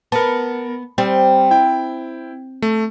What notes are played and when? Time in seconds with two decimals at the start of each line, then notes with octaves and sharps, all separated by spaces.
0.12 B3 A#4 A5
0.98 G3 C4
1.51 E4 G5
2.62 A3